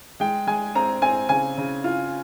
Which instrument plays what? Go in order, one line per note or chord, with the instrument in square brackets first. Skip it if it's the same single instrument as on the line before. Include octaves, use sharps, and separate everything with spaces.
[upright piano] G#3 G5
G#3 G#5
C4 A#5
C4 G#5
C#3 G#5
C#3
F4